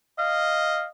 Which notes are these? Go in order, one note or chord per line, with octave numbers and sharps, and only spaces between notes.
D#5 F5